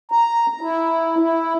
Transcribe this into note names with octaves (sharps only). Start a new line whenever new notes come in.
A#5
E4
E4